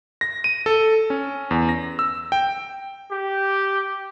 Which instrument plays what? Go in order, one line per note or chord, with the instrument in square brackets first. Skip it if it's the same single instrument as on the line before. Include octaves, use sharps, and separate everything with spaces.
[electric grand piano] A#6
D#7
A4
C#4
E2
A#6
E6
G5
[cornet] G4